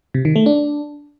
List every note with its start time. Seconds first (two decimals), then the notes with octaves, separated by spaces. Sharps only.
0.14 C3
0.25 D#3
0.36 A3
0.46 D4